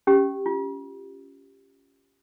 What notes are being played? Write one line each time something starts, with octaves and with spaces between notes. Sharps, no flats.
C#4 G4
F4